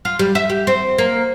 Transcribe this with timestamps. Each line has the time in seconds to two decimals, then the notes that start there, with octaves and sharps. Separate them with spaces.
0.05 F4
0.19 G3
0.35 E5
0.50 G4
0.67 C4
0.98 A#3